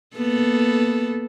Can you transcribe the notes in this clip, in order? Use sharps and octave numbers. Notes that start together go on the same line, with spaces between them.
A#3 B3 A4